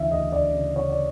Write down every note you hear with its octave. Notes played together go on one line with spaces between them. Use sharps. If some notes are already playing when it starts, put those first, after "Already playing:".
Already playing: D2 C#3 E3 E5 F5
D2 D#5
D2 D5
C#3
C#3 C#5
D5